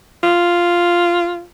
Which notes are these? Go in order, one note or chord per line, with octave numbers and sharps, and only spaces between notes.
F4